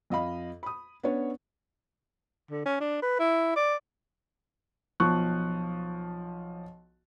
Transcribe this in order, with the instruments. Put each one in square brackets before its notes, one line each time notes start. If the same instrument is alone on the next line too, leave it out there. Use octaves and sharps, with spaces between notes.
[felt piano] F2 D#5 F5 B5
B5 D#6
B3 C#4 D4 C#5
[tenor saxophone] D3
C#4
D4
B4
E4
D5
[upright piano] B1 F3 C#6 F#6